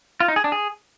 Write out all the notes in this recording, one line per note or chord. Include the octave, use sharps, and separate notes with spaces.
F4
D#4
G#4
D4
G#4